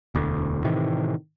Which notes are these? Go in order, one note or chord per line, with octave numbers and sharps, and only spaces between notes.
E1 D2
A2 C3 D#3 E3